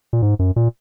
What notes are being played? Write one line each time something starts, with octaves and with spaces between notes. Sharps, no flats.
A#2
G#2
F#2
A#2